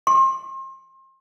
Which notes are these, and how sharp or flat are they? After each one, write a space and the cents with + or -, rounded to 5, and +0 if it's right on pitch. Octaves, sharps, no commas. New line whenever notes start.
C6 +30